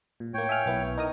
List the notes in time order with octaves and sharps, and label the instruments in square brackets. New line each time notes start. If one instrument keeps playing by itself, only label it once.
[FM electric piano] A#2
[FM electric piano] A2 A#3 [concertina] C#5 G5
[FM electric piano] E5 G#5 F6
B1 B3 E4
D#4 A#4 D#6